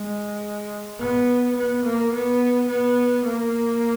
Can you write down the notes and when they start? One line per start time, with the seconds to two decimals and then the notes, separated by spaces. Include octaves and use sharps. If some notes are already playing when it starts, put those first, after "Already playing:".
Already playing: G#3
0.99 B3
1.57 B3
1.85 A#3
2.13 B3
2.69 B3
3.25 A#3